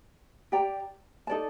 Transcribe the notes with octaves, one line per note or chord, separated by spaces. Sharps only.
G4 D5 G5 A#5
D#4 A4 D5 A5